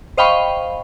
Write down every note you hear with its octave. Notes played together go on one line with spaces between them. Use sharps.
C5 D#5 F5 G5 B5 C#6